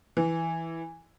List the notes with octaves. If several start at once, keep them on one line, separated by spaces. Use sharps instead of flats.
E3